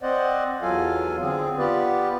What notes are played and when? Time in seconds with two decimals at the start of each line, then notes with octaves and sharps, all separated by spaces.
0.02 C4 C5 D5 D#5 F#5
0.62 E2 F#3 F4 A4 F5 G#5
1.21 D3 C4 G#4
1.58 B3 F4 G4 B4 D5